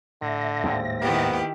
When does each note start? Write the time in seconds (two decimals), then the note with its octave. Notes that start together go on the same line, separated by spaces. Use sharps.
0.22 A2 D3 E5 A#6
0.64 D#2 G#2
1.02 D#3 B3 E4 G4